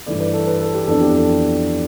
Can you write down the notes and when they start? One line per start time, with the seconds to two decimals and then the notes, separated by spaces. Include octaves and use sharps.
0.06 G2 E3 A3 D5
0.20 B4
0.33 A4
0.47 B4
0.61 A4
0.74 G4
0.87 F2 E3 B3 D4 A4
1.01 G4
1.14 A4